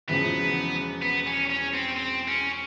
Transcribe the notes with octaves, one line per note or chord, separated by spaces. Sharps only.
E1 E2 C#3 F3 B3
B3
C#4
C#4
C4
C4
C#4